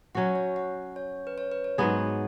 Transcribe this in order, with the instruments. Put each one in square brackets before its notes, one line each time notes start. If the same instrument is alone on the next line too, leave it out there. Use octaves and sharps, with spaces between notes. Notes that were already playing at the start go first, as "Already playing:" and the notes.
[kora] F#3 C#4 F#4 [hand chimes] F#5
[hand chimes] C#5
F#5
C#5
B4
C#5
B4
C#5
[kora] G#2 F#3 B3 G#4